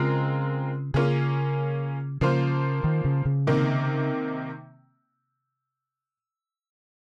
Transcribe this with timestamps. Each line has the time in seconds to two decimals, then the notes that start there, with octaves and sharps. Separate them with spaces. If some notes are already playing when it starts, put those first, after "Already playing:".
Already playing: C#3 G#3 C4 F4 A#4
0.94 C#3 A#3 C#4 F4 G#4
2.21 C#3 F3 A#3 F4 C5
2.84 D#3
3.05 C#3
3.25 C#3
3.47 C3 D#3 A#3